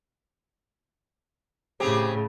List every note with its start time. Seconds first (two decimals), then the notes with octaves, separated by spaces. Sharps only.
1.80 A2 C#3 C4 G4 G#4